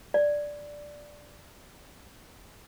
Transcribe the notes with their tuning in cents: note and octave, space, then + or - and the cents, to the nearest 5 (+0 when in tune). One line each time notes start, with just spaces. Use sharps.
D5 +0